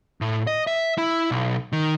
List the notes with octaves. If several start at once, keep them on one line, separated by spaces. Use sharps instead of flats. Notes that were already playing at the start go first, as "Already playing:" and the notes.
A2
D#5
E5
E4
B1
D#3